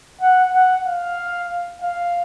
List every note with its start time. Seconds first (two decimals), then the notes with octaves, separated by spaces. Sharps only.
0.21 F#5
0.53 F#5
0.85 F5
1.82 F5